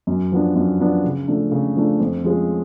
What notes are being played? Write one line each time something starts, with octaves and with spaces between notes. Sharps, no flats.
F#2
F3 B3 D4
F#2
F3 B3 D4
C#3
F3 A3 D4
C#3
F3 A3 D4
F2
F3 G#3 C#4